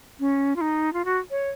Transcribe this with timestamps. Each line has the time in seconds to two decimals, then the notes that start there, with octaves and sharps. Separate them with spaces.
0.20 C#4
0.56 F4
0.61 D#4
0.93 F4
1.05 F#4
1.31 C#5